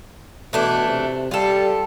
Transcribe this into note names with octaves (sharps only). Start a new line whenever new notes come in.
B2 E3 A3 D4
C3
G3 F4 A4